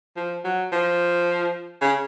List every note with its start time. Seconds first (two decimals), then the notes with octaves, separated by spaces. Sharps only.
0.17 F3
0.44 F#3
0.72 F3
1.81 C#3